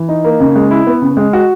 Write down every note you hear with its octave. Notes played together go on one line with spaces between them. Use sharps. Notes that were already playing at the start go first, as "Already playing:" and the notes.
Already playing: E3
D#4
A#3
C#3
G#3
E4
B3
C#3
G#3
F#4